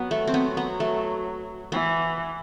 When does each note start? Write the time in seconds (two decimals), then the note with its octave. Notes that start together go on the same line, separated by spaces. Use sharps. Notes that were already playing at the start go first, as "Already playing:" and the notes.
Already playing: F#3 B3
0.11 A3
0.27 C4
0.34 B3
0.57 B3
0.80 A3
1.72 E3 B3